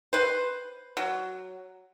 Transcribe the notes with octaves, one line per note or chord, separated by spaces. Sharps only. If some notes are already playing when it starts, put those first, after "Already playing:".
B4 C5
F#3